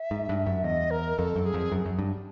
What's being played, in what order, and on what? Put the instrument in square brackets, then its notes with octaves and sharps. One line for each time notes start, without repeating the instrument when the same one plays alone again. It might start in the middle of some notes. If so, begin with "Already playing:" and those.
Already playing: [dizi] E5
[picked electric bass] G#2
G2
F#2
[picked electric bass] E2 [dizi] D#5
[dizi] A#4
[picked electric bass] F2 [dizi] A4
[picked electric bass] F#2
[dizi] G#4
[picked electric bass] F2
F#2
F#2
G2